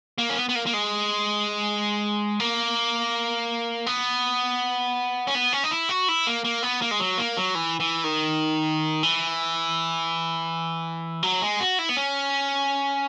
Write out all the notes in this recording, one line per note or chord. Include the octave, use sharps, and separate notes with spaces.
A#3
C#4
B3
B3
A#3
A#3
G#3
A#3
B3
C#4
B3
C#4
D#4
E4
F#4
E4
A#3
A#3
B3
A#3
G#3
F#3
A#3
F#3
E3
E3
D#3
E3
F#3
G#3
F#4
E4
B3
C#4